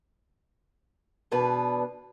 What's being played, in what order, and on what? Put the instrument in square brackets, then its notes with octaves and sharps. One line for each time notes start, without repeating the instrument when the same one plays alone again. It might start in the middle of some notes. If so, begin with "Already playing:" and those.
[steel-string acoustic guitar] E2 B2 B3 D4 B4